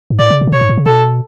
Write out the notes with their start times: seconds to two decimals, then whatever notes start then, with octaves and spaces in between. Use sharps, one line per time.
0.10 G#2
0.19 A2 D5
0.30 C#3
0.41 B2
0.47 C#3
0.52 B2 C#5
0.61 G#2
0.69 A2
0.77 C#3
0.86 B2 A4